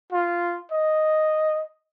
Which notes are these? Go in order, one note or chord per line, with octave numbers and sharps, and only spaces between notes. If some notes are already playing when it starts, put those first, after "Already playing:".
F4
D#5